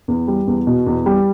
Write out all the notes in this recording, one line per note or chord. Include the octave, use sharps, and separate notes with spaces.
E2
G3
E2
B2
E2
G3